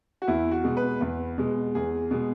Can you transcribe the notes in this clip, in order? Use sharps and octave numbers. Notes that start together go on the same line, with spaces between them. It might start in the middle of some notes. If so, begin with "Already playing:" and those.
F#4
E2 E4
F#4
B2 G#3
B4
E2
B2 G#3
E2 G#4
B2 G#3